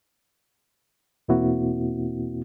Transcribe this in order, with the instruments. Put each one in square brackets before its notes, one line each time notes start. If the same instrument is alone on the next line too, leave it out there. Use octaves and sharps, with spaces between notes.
[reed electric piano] E2 B2 A#3 C4 E4 F#4